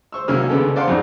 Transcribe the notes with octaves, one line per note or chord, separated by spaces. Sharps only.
C5 C#6 E6
C2 F#3 A#3 C#4 E6 F6
C#2 C#3 B3 D4 A4
C5 D5 F5 F#5 A5 C6
F2 G#2 C#3